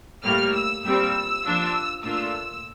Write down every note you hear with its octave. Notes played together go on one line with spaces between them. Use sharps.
A2 G3 A#3 F6
E6
A#2 G3 C4 E6
F3 A#3 D4 F4
A#2 A3 D4 F4 E6